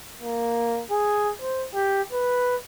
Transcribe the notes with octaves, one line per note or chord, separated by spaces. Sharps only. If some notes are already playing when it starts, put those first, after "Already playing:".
A#3
G#4
C5
G4
B4